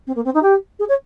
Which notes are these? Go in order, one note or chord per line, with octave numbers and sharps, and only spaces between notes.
C4
A#3
C4
D#4
G4
G#4
C#5